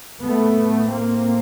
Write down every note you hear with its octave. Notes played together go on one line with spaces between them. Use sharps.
A2 A3 B3
A#3 C4